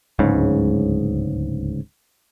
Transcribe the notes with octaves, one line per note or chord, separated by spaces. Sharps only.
D1 C#2 G#2 C#3